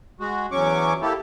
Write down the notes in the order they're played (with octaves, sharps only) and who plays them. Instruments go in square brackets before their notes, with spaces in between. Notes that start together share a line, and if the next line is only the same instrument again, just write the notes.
[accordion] G#3 F#4
E2 F#3 C#4 C#6 D6
A#3 E4 G4 A4